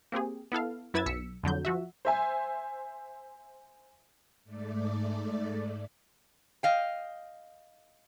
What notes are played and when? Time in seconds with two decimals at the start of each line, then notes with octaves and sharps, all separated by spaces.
0.12 A#3 C4 G4 G#4
0.52 B3 E4 A4 F5
0.94 F#2 E4 B4 E6 G#6 A6
1.06 B1 E6 B6 C#7
1.43 F2 D3 F#3 G6
1.65 F3 F#4 E5
2.05 C5 E5 G#5
4.44 G#2 A3 D5
6.63 D#5 F5 G5